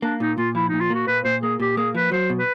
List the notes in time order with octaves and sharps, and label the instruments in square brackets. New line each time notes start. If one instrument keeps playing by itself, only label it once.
[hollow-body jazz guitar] A#3 [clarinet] D4
[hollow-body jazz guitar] A#2 [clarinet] D#4
[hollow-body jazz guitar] A#2 [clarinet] F4
[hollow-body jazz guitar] F3 [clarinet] E4
[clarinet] D#4
[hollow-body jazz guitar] A#2
[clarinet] F4
[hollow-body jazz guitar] A#3 [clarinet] F#4
[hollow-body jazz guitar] A#2 [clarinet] B4
[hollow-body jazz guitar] A#2 [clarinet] C5
[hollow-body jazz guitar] A#3 [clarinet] G#4
[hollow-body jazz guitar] A#2 [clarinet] G4
[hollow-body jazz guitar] A#3 [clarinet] G#4
[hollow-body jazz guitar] F3 [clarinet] B4
[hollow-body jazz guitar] F#3 [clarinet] C5
[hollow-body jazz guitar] B2
[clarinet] B4